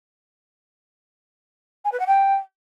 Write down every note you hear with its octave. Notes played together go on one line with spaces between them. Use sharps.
G#5
B4
F#5
G5